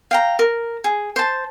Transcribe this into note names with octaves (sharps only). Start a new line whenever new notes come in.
F5 G5 A#5
A#4
G#4
C5 A5